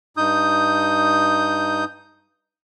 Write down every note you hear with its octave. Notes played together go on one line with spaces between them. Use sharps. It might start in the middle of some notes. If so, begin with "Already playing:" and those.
G2 D#4 D#6 G6